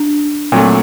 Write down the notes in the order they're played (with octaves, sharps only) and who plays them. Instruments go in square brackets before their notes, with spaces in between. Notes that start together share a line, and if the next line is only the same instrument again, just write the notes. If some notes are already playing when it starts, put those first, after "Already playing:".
Already playing: [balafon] D4
[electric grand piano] A#2 F#3 A3 [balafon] C4